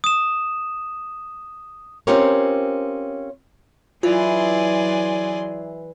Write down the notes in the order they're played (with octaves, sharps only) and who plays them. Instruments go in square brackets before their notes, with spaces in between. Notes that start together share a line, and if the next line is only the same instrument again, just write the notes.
[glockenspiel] D#6 E7
[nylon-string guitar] C4 C#4 F4 G4 A#4 C#5
[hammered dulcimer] E3 [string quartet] F#3 G#5 C6 [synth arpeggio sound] F4 [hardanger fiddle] G#4 D5